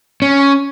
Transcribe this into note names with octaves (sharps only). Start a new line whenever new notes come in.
C#4